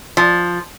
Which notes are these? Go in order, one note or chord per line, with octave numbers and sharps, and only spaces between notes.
F3